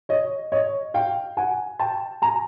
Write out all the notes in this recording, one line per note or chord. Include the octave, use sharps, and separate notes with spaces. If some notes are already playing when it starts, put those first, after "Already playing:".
C#5 D#5
C#5 D#5
F5 G5
F#5 G#5
G5 A5
G#5 A#5